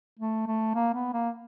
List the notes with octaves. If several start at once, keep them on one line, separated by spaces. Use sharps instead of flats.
A3
A3
A#3
B3
A#3